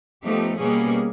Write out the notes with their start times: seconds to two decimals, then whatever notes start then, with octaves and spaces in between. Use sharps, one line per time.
0.24 F3 A3 B3 D#4 G4
0.58 B2 G3 A#3 C#4 G#4